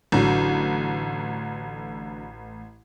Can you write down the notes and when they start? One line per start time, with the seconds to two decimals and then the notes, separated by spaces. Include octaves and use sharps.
0.12 A1 D3 F#3